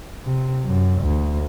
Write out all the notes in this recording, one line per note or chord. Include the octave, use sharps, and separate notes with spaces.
C3
F#2
D2